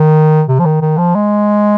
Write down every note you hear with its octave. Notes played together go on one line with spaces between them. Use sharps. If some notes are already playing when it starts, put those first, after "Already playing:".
Already playing: D#3
C3
F3
D#3
D#3
F3
G#3